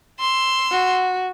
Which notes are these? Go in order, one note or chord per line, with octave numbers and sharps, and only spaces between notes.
C6 E6
F#4